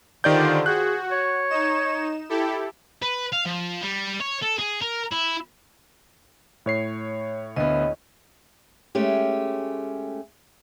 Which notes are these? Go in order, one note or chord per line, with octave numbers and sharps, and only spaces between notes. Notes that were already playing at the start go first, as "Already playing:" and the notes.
D3 D#3 F4 G4 C5 D5 G6
F#4 G#4 F#6
C#5
D#4 E7
E4 G4 A4
B4
F5
F3
G3
C#5
A4
G#4
A#4
E4
A2 C#5 C7
D2 B3 D#5
G#3 A3 C#4 G4